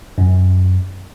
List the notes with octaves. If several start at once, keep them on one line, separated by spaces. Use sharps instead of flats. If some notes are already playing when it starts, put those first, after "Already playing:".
F#2